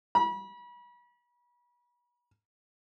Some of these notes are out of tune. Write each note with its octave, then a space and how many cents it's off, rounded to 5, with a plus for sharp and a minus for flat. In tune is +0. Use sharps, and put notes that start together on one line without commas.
B5 -35